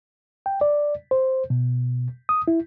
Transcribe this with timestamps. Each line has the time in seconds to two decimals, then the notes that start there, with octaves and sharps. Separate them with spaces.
0.46 G5
0.61 D5
1.11 C5
1.50 B2
2.29 D#6
2.48 E4